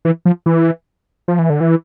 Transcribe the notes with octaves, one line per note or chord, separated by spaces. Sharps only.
E3
F3
E3
F3
E3
D3
E3